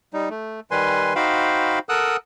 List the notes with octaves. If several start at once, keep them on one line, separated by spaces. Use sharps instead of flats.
G3 D#4
A3
D#3 G3 B4 G#5 C6
D#4 F#4 C5 F5 G5 B5
A4 A#4 F#5 D#6 E6 F#6